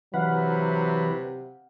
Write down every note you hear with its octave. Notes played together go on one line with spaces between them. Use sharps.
C3 E3 F#3 B4 F5 F#5